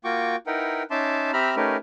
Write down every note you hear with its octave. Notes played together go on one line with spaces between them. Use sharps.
A#3 F4 F#4 G5 C#6 D6
D#4 E4 A#4 B4 F#5 G5
C#4 D#4 E5 A5 C6 D6
C4 G4 E5 A#5 B5 F6
A3 C#4 D#4 G4 A#4 B4